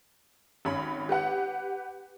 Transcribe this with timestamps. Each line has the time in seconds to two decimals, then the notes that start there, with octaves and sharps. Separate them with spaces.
0.65 G#1 C#4 B5
1.09 G4 B4 F#5